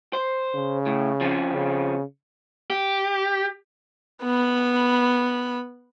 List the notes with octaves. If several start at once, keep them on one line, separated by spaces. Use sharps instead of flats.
C5
C#3
A2
F3 C4 C#4
C#3
G4
B3 B5